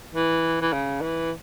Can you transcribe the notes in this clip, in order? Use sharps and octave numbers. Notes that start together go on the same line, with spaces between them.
E3
E3
C#3
E3